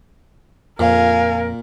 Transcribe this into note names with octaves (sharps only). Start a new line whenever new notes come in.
F2 A#2 A#4 F5 G#5